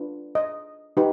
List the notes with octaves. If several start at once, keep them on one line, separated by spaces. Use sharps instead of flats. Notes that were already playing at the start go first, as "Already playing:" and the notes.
Already playing: D4 F4 B4
D#5
D#4 G4 B4